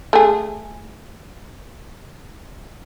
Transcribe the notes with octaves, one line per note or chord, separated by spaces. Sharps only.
A3 G#4